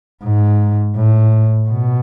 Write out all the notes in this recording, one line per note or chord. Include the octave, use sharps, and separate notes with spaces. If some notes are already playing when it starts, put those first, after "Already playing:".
G#2
A2
B2